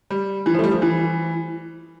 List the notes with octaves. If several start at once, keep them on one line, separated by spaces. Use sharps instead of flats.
G3
E3
F3
A3
G3
F3
E3